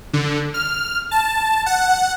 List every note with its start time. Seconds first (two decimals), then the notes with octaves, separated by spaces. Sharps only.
0.13 D3
0.54 F6
1.11 A5
1.66 F#5